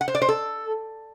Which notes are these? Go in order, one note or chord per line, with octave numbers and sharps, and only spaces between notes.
F#5
C5
D5
C5
A4